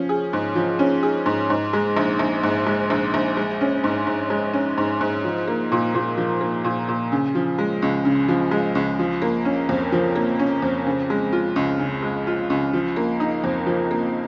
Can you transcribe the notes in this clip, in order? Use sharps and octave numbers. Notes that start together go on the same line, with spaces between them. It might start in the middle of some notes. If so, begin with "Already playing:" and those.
Already playing: F3 C#4
G#4
G#2
F3
C#4
G#4
G#2
G#2
G#3
A#1
A#1
G#2
G#3
A#1
A#1
G#3
C#4
G#2
G#2
G#3
C#4
G#2
G#2
F3
A#3
A#2
A#2
F3
A#3
A#2
A#2
C#3
F3
G#3
C#2
C#3
F3
G#3
C#2
F3
A#3
C#4
F2
F3
A#3
C#4
F2
C#3
G#3
F4
C#2
C#3
G#3
F4
C#2
F3
A#3
D#4
F2
F3
A#3